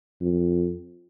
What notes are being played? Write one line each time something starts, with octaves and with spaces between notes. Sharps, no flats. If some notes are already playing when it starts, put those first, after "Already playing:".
F2